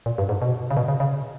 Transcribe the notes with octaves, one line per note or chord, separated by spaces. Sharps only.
A#2
G2
G#2
B2
C#3
B2
C#3
C#3